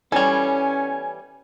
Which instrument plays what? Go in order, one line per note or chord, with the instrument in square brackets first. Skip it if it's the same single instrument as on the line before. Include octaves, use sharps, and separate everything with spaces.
[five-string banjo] E3 G3 [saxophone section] B3 C#4 [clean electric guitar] A4 C#5 [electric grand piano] G#5